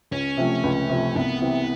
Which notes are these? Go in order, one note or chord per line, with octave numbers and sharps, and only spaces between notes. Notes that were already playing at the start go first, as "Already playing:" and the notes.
C#2 C#4
C3 F3 A3
C#2
C3 F3 A3
C2 B3
C3 E3